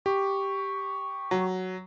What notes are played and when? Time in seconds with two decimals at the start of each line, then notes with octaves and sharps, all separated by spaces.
0.06 G4 C#6
1.31 F#3